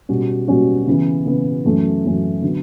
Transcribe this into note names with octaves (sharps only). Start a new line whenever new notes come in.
B2 G3 C#4 F#4
B2 G3 C#4 F#4
C#3 E3 B3
C#3 E3 B3
F#2 E3 A3 C#4
F#2 E3 A3 C#4
D3 F#3 B3